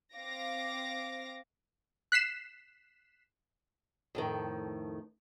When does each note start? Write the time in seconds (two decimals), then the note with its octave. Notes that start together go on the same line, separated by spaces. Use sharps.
0.15 C4 F5 D6 A#6
2.12 F#6 B6 C7 E7
4.15 F2 A2 D#3